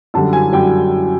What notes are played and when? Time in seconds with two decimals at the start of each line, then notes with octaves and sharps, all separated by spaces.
0.14 F#2 D3 G3 A5
0.33 G#5
0.52 F#2 D3 G3 G5